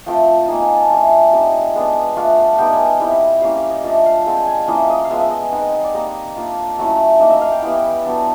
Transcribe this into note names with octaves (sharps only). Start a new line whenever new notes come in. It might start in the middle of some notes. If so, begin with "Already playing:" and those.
F3 A3 C4 F4 G5
A#3 D#4 G#5
G#5
A5
A3 D4 F4 G#5
G3 C4 D#4
G#3 B3 D4
A3 D4 F4 F#5
G3 B3 D#4 G5
G#5
G5
G3 C4 E4
G3 A#3 C#4 E4 F5
F5
D#5
F3 A3 D4 F4 E5
F5
G#3 C4 F4 G5
G#5
G#5
G5
F3 A#3 C#4 E4 D#5
D#5
F5
F3 G#3 B3 E5
E5
D#5
G#5
G#3 C4 D#4 F#5
D#5
D#5
D5
G3 A#3 D#4 D#5
A#3 D4 F4
F#3 A3 C#4 E4
A#3 D#4 D#5
E5
F5
G5
G3 B3 E4 G5
F#3 B3 D4